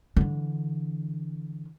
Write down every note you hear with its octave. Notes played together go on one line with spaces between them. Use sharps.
D3 E3